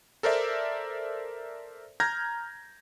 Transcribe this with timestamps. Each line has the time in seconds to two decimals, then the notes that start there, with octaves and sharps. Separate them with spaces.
0.23 A4 A#4 C5 D5 E5
2.00 A#5 F6 G6 G#6 A#6